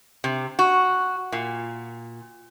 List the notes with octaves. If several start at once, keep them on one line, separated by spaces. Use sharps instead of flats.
C3
F#4
A#2